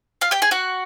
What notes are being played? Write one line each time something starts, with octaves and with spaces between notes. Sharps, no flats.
F4 F5
G4 G5
G#4 G#5
F#4 F#5